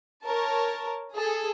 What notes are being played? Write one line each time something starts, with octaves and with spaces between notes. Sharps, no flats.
A#4 C#5 A5
G#4 A4